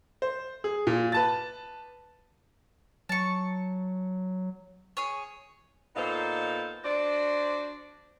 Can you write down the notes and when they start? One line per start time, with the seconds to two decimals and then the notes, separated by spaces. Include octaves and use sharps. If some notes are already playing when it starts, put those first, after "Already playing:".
0.22 C5
0.64 G#4
0.87 A#2
1.12 B4 A5 A6
3.09 F#3 A5 C#6
4.97 G#4 C#5
5.96 A#2 B3 D#4 A4 C5 F5
6.84 D4 F#4 C5 D5